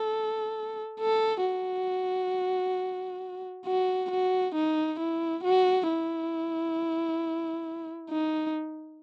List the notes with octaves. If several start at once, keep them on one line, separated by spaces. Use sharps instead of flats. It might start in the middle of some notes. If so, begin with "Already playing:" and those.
Already playing: A4
A4
F#4
F#4
F#4
D#4
E4
F#4
E4
D#4